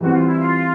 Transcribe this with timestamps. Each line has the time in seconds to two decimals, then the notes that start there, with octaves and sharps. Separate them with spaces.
0.01 E3 G3 C4 F#4
0.13 F4
0.26 E4
0.39 F4